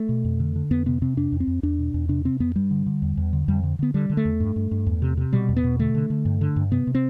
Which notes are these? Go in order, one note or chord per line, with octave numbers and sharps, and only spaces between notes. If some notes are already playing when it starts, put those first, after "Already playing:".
Already playing: A3
B2
F2
D3
D3
F2 B3
C3 B3
C3 C4
F2 D4
F2
C4
F2
E2 D4
B2
E2
C3 D4
C3 C4
F2 B3
G2 G3
D3
D3
E2
E2
D3
F2 G3
D3
D3 B3
D3 G3
D3
A3
E2
G2
G2
G2
E2
C3
C3
B2 G3
E2
B3
B2
D3 A3
D3
D3
G2
D3
G2
C3 B3
C3
C4